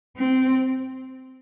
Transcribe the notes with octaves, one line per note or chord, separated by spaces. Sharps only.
C4